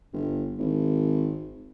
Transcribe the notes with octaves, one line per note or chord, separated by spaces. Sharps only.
G1
G#1